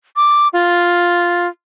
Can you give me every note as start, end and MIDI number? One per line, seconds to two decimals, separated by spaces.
0.16 0.48 86
0.53 1.48 65